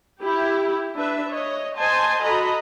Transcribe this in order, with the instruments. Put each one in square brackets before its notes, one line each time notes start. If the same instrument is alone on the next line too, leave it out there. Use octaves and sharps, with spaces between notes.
[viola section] E4 G4
D4 B4 E5
C#5 D#5
C5 D#5 G#5 A5 C6
F#4 A4 D#5 A#5 B5